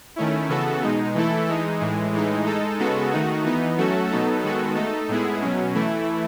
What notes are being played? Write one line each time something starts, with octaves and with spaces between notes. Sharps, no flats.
D#3 A3 C#4 E4
C#3 E3 B3 F#4 A4
B2 G#3 D#4
E3 A3 E4 A4
E3 G#3 D#4
A2 E3 G#3
A2 E3 G#3 D#4
G#3 D#4 A4
C#3 G#3 B3 F#4 A4
D#3 A3 D#4 F#4
E3 B3 D#4
F#3 A3 C#4 F#4 A4
B2 F#3 B3 D#4 A4
D#3 G#3 B3 F#4 A4
A3 D#4 A4
A2 G#3 B3 E4 G#4
B2 F#3 C#4
E3 A3 E4